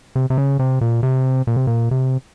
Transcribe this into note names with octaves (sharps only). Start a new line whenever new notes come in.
C3
C3
C#3
C3
A#2
C3
A#2
C3
A#2
C3